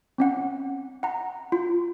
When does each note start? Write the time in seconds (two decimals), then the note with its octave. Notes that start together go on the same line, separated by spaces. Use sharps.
0.18 C4 C#4 F#5
1.03 F#5 A#5
1.52 F4